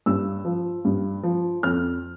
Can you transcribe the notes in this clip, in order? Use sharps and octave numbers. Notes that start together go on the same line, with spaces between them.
G2 E6
F3
G2
F3
F2 F6